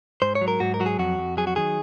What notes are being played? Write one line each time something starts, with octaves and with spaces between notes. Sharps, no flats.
G#2 C5
C#5
F#3
A#4
G#2 F#4
A#4
F#3 F#4
G#4
F2 F#4
F2
F#3 G#4
F#4
D#3 G#4